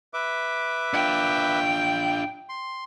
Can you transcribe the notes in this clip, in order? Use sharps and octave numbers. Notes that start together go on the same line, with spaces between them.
B4 E5 D6
D4 F4 G5
C6